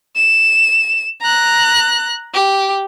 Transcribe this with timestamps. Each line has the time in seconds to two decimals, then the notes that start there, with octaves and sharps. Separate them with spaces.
0.16 E7
1.21 A#5 F#6
2.34 G4